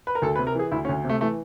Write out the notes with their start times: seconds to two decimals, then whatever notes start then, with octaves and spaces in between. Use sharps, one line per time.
0.07 B4
0.15 A#4
0.22 D2 A4
0.36 B4
0.39 C3
0.47 A#4
0.55 E3 G#4
0.71 D2 E4
0.85 C#4
0.89 D2
1.04 C3
1.09 A3
1.21 E3 A3